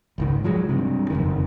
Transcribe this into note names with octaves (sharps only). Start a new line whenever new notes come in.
G#1 C#2 D#3
F3 F#3 G#3
G2 C3
F#1 F2 D#3